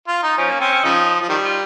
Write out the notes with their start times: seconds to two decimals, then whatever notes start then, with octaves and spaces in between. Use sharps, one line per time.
0.08 F4
0.23 D#4
0.38 F3 C#4
0.49 A#3
0.60 C4 C#4
0.72 C#4
0.83 C#3 F3 D#4
1.21 F3
1.29 D#3 G3
1.45 F4